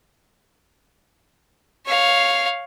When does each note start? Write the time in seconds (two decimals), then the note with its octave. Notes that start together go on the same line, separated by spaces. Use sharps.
1.86 C#5 F5